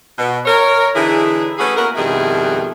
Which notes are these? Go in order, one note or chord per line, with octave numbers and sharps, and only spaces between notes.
B2
A#4 C#5
D3 E3 D#4 E4 G#4
A3 C#4 F#4 G#4 A4 B4
A#3 B3 F#4 A#4
F2 B2 D#3 G3 E4 G#4